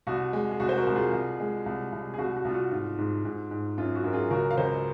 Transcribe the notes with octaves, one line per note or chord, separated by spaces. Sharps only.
C2 F#4
G#3
G#4
C2 F#4
C5
F#4 A#4
C2
F4 G#4
C2
G#3
C2
C2
G#4
C2 F#4
F#4
C2 F4
F#4
G#2 F4
G#2
G#2
G#2
F#2 F4
F#4
F#2 A#4
F4 G#4
C#2 F#4 A#4
F5
C#2 C5 D#5